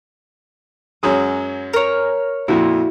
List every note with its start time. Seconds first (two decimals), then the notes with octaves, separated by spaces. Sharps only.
1.03 F#2 F#3 G#3 A#5 D#6
1.74 A#4 C#5
2.48 F2 A#2 E4 F#4